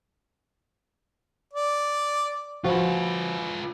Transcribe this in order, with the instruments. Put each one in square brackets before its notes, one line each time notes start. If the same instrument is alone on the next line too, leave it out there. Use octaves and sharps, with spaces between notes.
[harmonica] D5
[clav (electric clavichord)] F3 F#4 [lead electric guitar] F4 B4